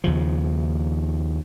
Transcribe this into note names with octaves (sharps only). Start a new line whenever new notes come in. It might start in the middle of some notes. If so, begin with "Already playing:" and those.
D#2 C#3 F3